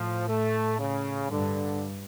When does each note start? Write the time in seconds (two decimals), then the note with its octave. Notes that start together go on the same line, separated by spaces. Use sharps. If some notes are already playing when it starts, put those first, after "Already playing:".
Already playing: A2 F3
0.27 A3
0.78 C#3
1.29 G2 D3